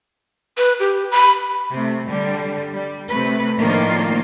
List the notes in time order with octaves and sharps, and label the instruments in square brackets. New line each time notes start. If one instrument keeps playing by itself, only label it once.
[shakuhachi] B4
G4
B5
[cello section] C3 A3
D3 G3
G3
C3 A3 B4
A2 D#3 F3 A#3 D4 F4